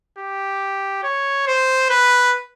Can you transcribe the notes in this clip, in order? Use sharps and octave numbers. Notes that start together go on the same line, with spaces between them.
G4
C#5
C5
B4